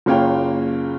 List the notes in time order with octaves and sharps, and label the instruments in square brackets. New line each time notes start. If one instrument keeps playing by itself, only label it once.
[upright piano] F#1 C#3 A#3 F4 C#5 G5